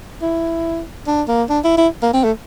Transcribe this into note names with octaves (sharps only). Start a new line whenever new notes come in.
E4
D4
A#3
D4
E4
E4
A#3
C4
A3